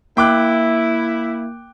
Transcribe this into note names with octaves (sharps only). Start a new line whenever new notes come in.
A#3 E4 G5 D6 F#6